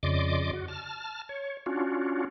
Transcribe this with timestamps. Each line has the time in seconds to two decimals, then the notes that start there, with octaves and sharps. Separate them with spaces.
0.03 F2 C#3 D5 D#5 C6 D6
0.53 F#4
0.68 A5 F6
1.29 C#5
1.66 C#4 D4 F4 F#4